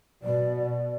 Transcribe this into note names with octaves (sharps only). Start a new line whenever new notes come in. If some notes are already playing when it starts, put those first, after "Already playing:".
B2 D5